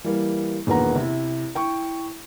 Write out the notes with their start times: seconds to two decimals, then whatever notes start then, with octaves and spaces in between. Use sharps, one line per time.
0.04 E3 G3 A#3
0.67 E1 A#2 D#3 B4 F#5 A#5
0.96 C3 E4
1.55 E4 G5 C#6